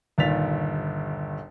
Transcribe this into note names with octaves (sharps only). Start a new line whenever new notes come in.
G1 D#2 A#2 A6 B6 F7